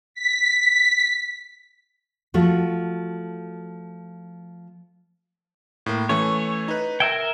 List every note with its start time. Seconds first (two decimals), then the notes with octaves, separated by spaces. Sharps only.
0.14 B6
2.34 F3 A3 F#4
5.86 A2 A#3
6.09 E3 A3 C#4 C#5
6.68 D#4 B4
7.00 A#4 E5 G5 G#6